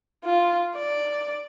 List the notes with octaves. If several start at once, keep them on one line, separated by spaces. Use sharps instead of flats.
F4
D5